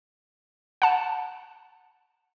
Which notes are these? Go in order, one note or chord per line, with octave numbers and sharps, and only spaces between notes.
F#5 A5